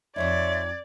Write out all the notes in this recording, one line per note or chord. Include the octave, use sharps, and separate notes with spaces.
F2 G#2 D#4 C#5 D5 E5 C6 G#6